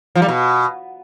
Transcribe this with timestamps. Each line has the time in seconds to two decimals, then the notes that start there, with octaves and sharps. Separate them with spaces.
0.15 F3
0.22 G3
0.28 B2